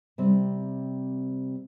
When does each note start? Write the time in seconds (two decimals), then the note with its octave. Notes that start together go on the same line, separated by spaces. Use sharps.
0.18 C3 G3 C4